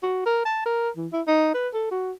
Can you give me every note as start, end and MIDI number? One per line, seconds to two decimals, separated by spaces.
0.03 0.24 66
0.26 0.44 70
0.46 0.61 81
0.65 0.90 70
0.97 1.08 52
1.13 1.22 64
1.27 1.51 63
1.54 1.68 71
1.74 1.88 69
1.91 2.12 66